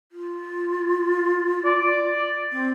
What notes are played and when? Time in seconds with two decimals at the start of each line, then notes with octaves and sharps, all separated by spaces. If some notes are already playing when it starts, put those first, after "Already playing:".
0.12 F4
1.65 D5
2.52 C4